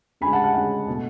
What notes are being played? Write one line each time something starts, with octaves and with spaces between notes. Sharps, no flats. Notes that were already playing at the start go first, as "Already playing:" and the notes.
D2 C#3 G#3 G#5 B5
F#5 A5
F#5
D2 C#3 G#3 F#5
B2 A3